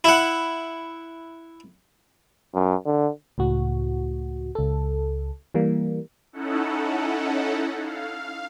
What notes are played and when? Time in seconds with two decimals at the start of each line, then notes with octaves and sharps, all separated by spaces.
0.04 E4 F#5
2.54 F#2
2.86 D3
3.38 C#2 A2 F#4
4.55 C#2 A4
5.54 E3 G3 A#3
6.33 C#4 D#4 E4 A4 F#5
7.78 F5